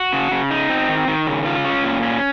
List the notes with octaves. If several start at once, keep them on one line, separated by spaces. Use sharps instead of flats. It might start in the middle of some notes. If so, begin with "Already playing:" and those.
Already playing: F#4
C#3
C#3
D#4
C4
D#3
D#3
C#3
F4
C#4
A#2
C#4